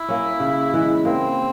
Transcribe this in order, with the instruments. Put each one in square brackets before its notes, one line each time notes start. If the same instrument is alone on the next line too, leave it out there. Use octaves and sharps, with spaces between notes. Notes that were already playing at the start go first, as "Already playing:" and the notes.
Already playing: [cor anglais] E4
[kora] A#3 C#4
C#3
E3 G#3
[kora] A#3 [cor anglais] C4